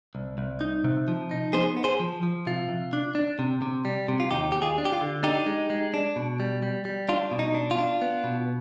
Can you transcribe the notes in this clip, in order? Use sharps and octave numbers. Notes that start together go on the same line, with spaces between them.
C2
C2
D#4
C3
F3
D#4
B3 G#4 C5
B3
G#4 C5
F3
F3
C3 F4
C3
D4
D4
C3
C3
G3
C3
F4
D#2 D#4 G4
D#2 G4
F4 G#4
D4
G4
F4
D3
D4 D#4 G4
G#3
G#3
D4
B2
G3
G3
G3
D4 F4
B2
D#4
D4
F4
D4
B3
B2